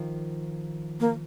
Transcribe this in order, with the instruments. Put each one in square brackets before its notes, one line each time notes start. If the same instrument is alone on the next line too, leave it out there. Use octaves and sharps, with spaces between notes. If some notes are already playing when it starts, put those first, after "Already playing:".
Already playing: [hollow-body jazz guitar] D#3 F3
[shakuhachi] A#3